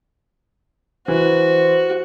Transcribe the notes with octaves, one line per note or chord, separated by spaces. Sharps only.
E3 F#4 C5